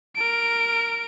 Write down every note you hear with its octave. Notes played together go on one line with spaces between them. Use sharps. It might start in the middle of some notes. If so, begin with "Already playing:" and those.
A#4 D7